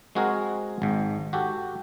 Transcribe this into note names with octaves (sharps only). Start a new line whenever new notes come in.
G#3 C4 F#4 G#4 A#4
G#1 G#2
F#4 G4 A4